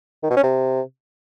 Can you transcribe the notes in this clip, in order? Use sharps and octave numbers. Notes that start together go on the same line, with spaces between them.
D#3
B2
C#4
C3